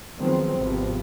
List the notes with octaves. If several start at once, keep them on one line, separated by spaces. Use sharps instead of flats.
D#3 F3 F#3 G#3 B3 C4
G#1 C3 F3 B3